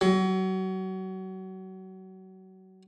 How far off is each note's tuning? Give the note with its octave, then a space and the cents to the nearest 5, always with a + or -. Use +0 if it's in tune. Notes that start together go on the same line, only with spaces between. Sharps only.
F#3 +30